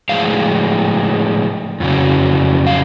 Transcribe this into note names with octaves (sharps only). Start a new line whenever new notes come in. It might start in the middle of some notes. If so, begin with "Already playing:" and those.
A2 F3 G#3 F5
F2 C#3 F#3
F5